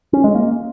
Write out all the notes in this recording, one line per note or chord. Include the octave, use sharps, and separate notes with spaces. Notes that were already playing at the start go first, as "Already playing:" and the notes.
C#4
G#3
A#3